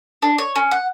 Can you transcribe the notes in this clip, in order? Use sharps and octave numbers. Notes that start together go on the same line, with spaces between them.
D4
C#5
C#4
F#5